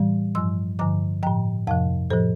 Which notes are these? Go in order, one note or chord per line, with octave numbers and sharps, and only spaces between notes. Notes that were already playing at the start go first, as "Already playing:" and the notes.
Already playing: A2 E3 G3
G2 F3 C6 E6
G2 D3 F3 A#5 D6
A2 F3 G5 A#5
F2 C3 F3 F5 A5
A2 F3 A4 C5